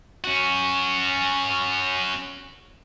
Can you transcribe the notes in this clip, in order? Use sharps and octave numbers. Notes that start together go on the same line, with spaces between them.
C#4 F#4